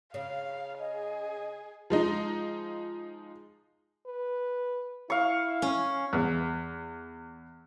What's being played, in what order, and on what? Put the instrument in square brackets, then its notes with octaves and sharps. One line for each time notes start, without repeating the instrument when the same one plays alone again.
[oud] C#3 [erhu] F5
[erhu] G#4 [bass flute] D#5
[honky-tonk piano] F3 G#3 D#4
[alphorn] B4
[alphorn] E4 [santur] F5 C#6
[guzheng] C#4
[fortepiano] E2